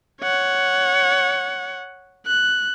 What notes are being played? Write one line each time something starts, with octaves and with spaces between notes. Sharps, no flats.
C#5 F#5
F#6